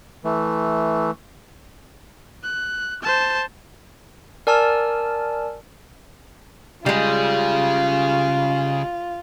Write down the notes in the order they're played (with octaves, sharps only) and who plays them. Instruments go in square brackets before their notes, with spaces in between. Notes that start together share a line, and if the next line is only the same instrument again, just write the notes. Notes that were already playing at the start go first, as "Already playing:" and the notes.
[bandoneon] E3 A3
[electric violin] F#6
C5 A5
[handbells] A#4 D5 G#5 A5 E6 F6
[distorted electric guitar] C#3 G#4 [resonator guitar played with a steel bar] G3 G#3 [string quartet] F4